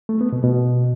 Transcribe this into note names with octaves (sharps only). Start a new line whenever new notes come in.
A3
B3
B2
B2